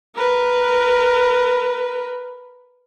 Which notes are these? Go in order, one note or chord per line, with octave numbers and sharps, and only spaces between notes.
A#4 B4